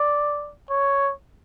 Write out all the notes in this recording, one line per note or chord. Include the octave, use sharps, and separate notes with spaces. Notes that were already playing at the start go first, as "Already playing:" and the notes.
Already playing: D5
C#5